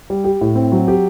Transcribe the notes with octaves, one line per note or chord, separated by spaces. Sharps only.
G3
G4
A2
C4
F#3
G4